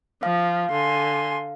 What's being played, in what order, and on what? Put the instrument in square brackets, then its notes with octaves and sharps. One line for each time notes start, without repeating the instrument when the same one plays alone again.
[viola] F3 [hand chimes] F5
[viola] D3 [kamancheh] G#5 C6